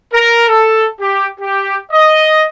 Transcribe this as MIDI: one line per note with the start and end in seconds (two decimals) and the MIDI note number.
0.13 0.44 70
0.47 0.86 69
1.00 1.26 67
1.40 1.76 67
1.92 2.45 75